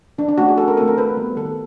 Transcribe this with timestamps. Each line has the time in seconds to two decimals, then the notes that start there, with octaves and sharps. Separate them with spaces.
0.18 E3 D4
0.28 D4
0.38 A3 C#4 F#4
0.48 G#4
0.58 E3 A4
0.68 A#4
0.77 A3 C4 A4
0.88 A#4
0.97 E3 B4
1.17 G3 B3
1.37 D#3 A4